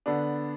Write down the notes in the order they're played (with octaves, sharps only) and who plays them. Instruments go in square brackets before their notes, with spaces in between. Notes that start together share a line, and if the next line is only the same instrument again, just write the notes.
[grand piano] D3 B3 D4